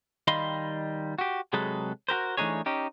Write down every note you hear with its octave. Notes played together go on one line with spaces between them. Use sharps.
D#3 G3 D#5 F5 B5 C6
F#4 G4
C3 F#3 G#3 G#4 A4 B4
F#4 G4 A#4 C5
E3 A3 D4 D#4 G#4 C#5
C#4 D#4 G4